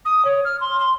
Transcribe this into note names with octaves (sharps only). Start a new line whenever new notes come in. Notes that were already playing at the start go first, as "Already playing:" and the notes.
D#6
C#5
F6
C6
C6